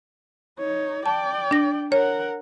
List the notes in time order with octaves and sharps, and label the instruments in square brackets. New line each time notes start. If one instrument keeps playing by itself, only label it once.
[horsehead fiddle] D#4 C#5
[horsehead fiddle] D5 G5 [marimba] A5
[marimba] D4 A#6
[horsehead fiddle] A#4 F#5 [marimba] C#5